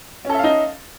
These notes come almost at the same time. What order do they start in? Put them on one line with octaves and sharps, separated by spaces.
C#4 A4 E5 F5 D#4